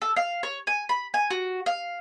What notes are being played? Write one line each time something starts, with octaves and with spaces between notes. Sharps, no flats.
A4
F5
C#5
G#5
B5
G#5
F#4
F5